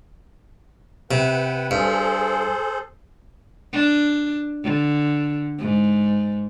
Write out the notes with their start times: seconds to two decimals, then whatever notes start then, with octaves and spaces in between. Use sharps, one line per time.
1.11 C3 B4 F#5 G5
1.71 G2 G#4 A4 C5
3.72 D4
4.64 D3
5.59 G#2